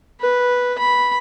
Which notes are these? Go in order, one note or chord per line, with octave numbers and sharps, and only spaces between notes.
B4
B5